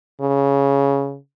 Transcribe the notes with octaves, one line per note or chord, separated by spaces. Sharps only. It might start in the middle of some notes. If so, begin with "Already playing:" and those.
C#3